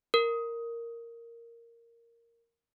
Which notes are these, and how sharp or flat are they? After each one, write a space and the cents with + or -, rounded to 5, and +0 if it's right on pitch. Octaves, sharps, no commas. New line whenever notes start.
A#4 -5